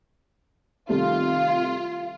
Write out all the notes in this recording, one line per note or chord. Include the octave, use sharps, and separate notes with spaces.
C3 D#3 G3 A3 F4 F5